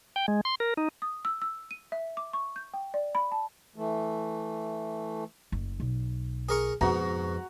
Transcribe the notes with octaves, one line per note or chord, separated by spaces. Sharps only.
G5
G#3
C6
A#4
D#4
D#6
E6
E6
D#7
E5
D6
C#6
G6
G5
D5
B5
A5
E3 A3
F#1
B1
G#4 A#4 C#6
F2 G#2 B2 F#4 F#5 A#5